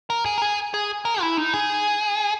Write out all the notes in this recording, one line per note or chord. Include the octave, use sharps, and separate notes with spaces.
A#4
G#4
A#4
G#4
G#4
A#4
E4
D#4
G#4